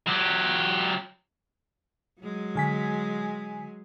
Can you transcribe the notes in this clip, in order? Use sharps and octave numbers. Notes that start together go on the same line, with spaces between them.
F#3 G4
F#3 G#3
D3 G#5 B6